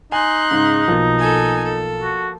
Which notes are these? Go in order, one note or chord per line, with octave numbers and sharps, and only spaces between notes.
D#4 G#5 C6 F#6
G#2 C#3
B1 B2 F3 A#3
A4 G#5
A4
F#4